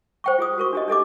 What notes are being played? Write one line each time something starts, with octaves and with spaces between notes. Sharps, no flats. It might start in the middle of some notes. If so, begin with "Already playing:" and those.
C5 G5 C#6
F4 G#4 D#6
F#4 A#4 C#6
D4 G4 D#5
D4 A4 D#5 D6